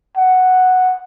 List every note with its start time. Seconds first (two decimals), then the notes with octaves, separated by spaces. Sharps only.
0.17 F#5